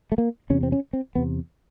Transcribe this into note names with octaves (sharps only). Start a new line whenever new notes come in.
A3
A#3
E2 C3 C#4
C4
C#4
C4
E2 C3 B3